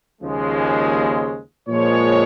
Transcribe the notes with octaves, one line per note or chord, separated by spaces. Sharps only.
D#2 C#3 F3 G#3
A#2 F3 G#3 C#5